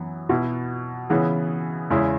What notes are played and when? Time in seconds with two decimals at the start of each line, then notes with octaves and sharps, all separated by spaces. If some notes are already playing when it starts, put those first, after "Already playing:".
Already playing: F#2 E3 B3
0.29 B2 B3 E4
1.09 C#3 E3 B3 E4 G#4
1.90 E2 C#3 G#3 E4 G#4